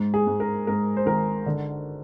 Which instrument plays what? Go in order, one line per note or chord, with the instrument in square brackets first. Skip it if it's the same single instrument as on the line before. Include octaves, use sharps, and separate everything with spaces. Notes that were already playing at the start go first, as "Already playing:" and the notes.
Already playing: [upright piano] G#2
G#4
G#2
A#4
G#2 A#4
C5
G#1 A#4
D3